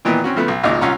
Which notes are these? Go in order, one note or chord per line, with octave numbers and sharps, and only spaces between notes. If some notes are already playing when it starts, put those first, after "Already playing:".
A#2 D#3 E3 B3
C4 C#4 F#4
C#3 F3 A3 B3
B1
G#1 C#2 A#2 G#3 D#4 D6
C2 C#4 F4 F#5 A#5